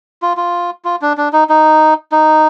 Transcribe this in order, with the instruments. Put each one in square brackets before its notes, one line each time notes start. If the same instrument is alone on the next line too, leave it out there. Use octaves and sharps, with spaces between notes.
[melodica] F4
F4
F4
D4
D4
D#4
D#4
D#4